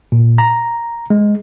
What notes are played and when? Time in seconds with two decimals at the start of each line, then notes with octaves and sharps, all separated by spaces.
0.12 A#2
0.38 A#5
1.10 G#3